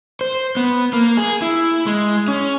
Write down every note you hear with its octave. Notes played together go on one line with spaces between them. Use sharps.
C5
B3
A#3
G#4
E4
G#3
C#4